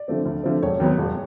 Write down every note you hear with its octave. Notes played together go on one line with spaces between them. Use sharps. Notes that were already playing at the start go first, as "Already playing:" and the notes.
Already playing: D5
D3 F3 A3 C4
D2
D3 F3 A3 C4
E1 C#5
D#2 D#3 F#3 B3
E1